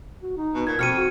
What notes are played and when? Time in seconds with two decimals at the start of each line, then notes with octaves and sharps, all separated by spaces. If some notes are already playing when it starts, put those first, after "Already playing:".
0.23 F#4
0.37 D#4
0.54 B2
0.67 A#2 G#6
0.79 F2 B2 F6 C#7 D#7
0.96 F#4